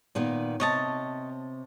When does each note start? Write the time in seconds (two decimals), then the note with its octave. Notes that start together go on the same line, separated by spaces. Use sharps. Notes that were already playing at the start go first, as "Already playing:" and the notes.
0.15 A#2 D#3 B3
0.60 C3 C#5 D#5 A5